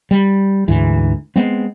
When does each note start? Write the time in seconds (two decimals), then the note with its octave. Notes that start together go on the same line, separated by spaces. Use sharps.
0.11 G3
0.68 D2 G#2 E3
1.36 G#3 B3 C4